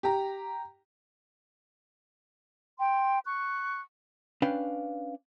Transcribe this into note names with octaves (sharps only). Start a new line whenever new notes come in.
G4 A#5
G5 C6
C#6 F#6
C#4 D4 B4 F5 G5